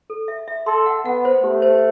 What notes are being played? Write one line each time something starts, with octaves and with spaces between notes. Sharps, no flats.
A4
E5
E5
A4 C6
F#5
B3 F#5
C5
A3 G4
C5